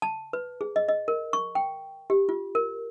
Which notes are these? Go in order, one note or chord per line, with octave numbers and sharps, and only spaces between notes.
A5
B4
G#4
D#5
D#5
A#4
C#6
G5
G4
F4
A#4